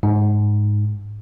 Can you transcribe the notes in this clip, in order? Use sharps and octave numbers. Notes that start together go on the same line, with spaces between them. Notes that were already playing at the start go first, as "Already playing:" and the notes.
G#2